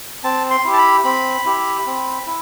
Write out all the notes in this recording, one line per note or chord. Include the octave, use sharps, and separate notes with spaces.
C4 A5
C6
E4 G4
A5
B5
C4 B5
E4 G4
C4
E4